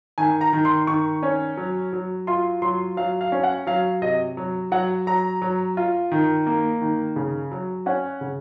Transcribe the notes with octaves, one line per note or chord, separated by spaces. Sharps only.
D#3 G#5
A#5
D#3
C6
D#3 C#6
C#4
F#3
F#3
F4 C6
F#3 C6
F#3 F5
F5
C#4
F#5
F#3 F5
C3 D#5
F#3
F#3 F#5
F#3 A#5
F#3
F4
D#3
A#3
D#3
C#3
F#3
C#4 F#5
C#3